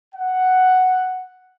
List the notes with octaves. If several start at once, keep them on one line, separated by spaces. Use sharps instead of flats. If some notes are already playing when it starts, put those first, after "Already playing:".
F#5